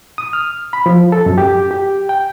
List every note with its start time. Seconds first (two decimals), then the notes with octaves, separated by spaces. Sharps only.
0.18 D#6
0.33 F6
0.73 B5
0.86 F3
1.12 A4
1.26 F#2
1.38 G4
1.71 G4
2.09 G5